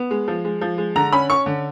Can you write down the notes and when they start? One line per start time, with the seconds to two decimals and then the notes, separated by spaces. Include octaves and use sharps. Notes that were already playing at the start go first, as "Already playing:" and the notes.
Already playing: B3
0.11 G#3
0.28 F3
0.45 G#3
0.61 F3
0.78 G#3
0.95 D3 A#5
1.12 C#4 B5
1.30 C#4 C#6
1.46 D3